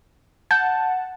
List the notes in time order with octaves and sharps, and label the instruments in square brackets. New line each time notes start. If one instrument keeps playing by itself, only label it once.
[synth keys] F#5 A5 [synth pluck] G6